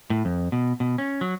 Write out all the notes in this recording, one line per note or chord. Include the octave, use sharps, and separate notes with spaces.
A2
F2
B2
B2
C#4
F#3